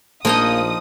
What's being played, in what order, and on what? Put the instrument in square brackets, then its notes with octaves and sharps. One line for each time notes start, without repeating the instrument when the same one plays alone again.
[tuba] A#1 [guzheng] F3 D#4 D#5 [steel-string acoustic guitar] A#3 [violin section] D#6